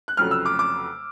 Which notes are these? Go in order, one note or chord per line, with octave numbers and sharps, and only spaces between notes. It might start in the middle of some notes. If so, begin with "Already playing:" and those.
F#6
F1 F2 C#3 F#3 A3 F6
E6
D6
D6